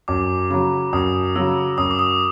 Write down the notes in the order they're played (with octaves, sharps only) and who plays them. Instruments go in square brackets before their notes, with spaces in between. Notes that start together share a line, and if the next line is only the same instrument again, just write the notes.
[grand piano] F#2 [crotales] D6
[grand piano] C#3 F#3 [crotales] D6
[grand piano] F#2 [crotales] D#6
[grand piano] C#3 F#3 [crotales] E6
[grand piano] F#2 [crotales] D#6
[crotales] D6
D#6